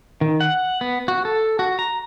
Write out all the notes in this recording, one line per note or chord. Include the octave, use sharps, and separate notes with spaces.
D#3
F#5
B3
F#4
A4
F#4
A#5